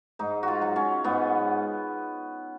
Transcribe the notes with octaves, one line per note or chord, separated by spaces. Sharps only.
G#2 D#4
F4 F#4
F#3
C#4
G#2 B3